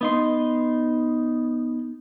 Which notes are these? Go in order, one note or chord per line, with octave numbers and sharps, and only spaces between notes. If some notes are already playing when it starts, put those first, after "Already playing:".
B3 D#4 C6